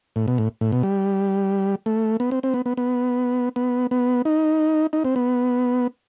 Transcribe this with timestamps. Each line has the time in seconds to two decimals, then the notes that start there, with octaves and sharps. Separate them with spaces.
0.16 A2
0.28 B2
0.38 A2
0.61 A2
0.72 B2
0.83 G3
1.86 A3
2.20 B3
2.31 C4
2.43 C4
2.54 B3
2.66 B3
2.77 B3
3.56 B3
3.91 B3
4.25 D#4
4.93 D#4
5.04 C4
5.16 B3